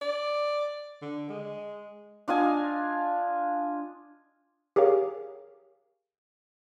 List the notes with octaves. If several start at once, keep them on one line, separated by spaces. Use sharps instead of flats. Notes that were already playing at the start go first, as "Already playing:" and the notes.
D5
D3
G#3
D4 F4 D#5 G#5
G4 G#4 A#4 C#5 F5